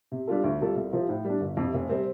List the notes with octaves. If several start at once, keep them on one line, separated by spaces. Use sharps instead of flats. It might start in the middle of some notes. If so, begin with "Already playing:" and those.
C3
G3 D4 F4 A4
D2
C3 G3 F4 A4
C2
C3 F3 C4 F4
A2
G3 D4
G1
F2 C3
F1
C3 G3 C4